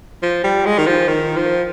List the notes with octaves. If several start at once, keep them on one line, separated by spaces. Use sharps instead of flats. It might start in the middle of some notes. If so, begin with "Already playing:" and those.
F3
G3
G#3
D#3
F3
D#3
F3